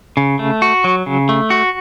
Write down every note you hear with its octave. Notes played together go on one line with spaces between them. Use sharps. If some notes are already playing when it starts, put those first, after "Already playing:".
C#3
A3
F#4
F#3
C#3
A3
F#4